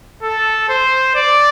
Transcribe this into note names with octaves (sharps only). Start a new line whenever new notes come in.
A4
C5
D5